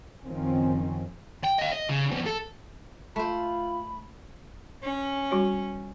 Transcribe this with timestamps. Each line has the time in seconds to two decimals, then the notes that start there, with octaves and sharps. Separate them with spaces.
0.25 F#1 D#3 F3 C4 C#4
1.44 G5
1.58 D#5 F5
1.72 D#5
1.89 C#3
2.11 F2 B3
2.26 A4
3.16 A3 F4 C5 B5
4.82 C#4
5.31 G3 F#4 C#5